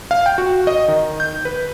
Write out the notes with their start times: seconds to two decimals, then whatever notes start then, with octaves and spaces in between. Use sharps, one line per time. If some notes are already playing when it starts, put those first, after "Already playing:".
0.11 F5
0.26 G5
0.38 F#4
0.67 D#5
0.88 D#3
1.20 G6
1.45 B4